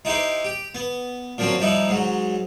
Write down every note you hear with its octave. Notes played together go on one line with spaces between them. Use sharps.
D#4 E4 G4 C5
G4
B3
A#2 F3 F#3 C4 C#4
F3 G3 D#4 E4
G#2 F#3